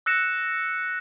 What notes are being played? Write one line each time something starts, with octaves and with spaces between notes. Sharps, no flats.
E6 F#6 A#6 C#7 E7